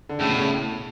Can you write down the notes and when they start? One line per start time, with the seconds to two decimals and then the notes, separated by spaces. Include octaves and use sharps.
0.09 D3
0.19 A2 C#3
0.29 B2
0.39 C#3